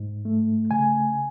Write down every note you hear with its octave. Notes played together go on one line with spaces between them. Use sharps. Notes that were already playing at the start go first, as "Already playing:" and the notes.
Already playing: G#2
A3
C#3 G#5